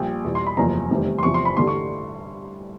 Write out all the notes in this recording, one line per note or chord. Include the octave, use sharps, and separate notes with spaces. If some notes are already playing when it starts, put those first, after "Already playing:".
Already playing: A#1 A#2 G3 G5
E2 B2 G3
C6
B5
F#1 E2 C3 F3 A#5
F1 E2 C3 D#3 G3
C6
E2 C3 F3 C#6
C6
B5
A1 G2 D3 G3 C6
C#6